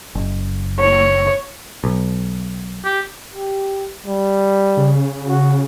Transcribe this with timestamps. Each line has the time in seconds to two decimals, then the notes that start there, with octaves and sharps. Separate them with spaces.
0.15 F#1
0.79 C#5
1.84 B1
2.84 G4
3.34 G4
4.06 G3
4.77 C#3
5.27 F#4